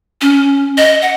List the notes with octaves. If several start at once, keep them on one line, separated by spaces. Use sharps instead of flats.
C#4
D#5
F#5